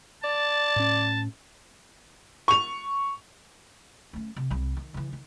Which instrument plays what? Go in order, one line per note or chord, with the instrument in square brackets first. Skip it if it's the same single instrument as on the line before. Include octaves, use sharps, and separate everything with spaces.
[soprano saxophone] D5 [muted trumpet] A5
[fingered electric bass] A2 C#4
[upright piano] C#6 F7
[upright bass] A3 C#4
C3
C2 G3
D#3
C#3 E3
D#3